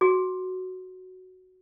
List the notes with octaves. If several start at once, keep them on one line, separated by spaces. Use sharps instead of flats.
F#4 G#4